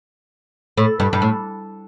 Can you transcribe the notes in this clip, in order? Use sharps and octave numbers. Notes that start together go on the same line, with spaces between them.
A2
G2
G2
A2